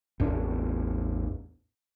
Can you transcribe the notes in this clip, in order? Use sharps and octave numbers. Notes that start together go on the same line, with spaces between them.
A1 E2 D4